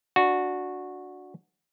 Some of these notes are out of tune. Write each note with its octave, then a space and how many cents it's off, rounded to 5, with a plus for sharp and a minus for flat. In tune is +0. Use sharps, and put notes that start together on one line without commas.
D4 +0 F#4 -10